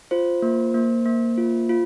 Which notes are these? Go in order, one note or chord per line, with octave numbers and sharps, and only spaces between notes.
F4 C5
A#3
A#3
A#3
F4
F4